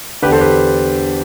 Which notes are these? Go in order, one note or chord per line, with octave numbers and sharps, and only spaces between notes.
E2 D3 G4 B4
A4 C5
G4 B4